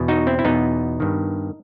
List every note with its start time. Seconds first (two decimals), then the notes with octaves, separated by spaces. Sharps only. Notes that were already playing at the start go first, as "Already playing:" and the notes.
Already playing: E2 B2
0.08 D#4 F#4
0.27 C4 E4
0.39 E4
0.45 E2 B2 B3 D#4
1.00 G2 D#3